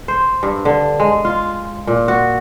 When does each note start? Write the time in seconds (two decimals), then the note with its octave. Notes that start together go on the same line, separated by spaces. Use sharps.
0.08 C5
0.43 G2
0.65 D3
1.00 G#3
1.25 F4
1.87 A#2
2.08 F#4